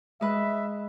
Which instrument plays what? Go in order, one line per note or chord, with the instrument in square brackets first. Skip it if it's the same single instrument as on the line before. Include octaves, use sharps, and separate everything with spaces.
[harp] G#3 B4 [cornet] E5